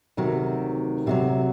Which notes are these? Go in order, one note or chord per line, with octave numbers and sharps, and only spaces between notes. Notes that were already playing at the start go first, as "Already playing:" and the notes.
D2 C3 D#3 F#3
D2 C3 D#3 F#3